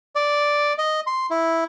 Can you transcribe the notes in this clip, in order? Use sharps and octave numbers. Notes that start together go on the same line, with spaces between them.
D5
D#5
C6
E4